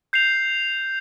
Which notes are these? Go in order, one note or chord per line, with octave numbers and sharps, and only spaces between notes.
G6 C7 F7